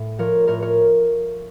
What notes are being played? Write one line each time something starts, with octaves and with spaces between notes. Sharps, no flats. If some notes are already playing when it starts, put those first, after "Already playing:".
Already playing: A2
F3 A#4 C#5
A2 A#4 C#5
A#4 C#5